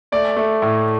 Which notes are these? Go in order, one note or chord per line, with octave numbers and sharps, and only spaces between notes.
A3 D5
A3
A2